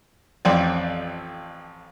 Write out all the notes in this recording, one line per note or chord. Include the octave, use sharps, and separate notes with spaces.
A1 F2 C4 D5